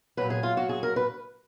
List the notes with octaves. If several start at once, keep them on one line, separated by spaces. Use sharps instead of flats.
A#2 F#3 B4
G#4
F4
F#4
G#4
A#4
B4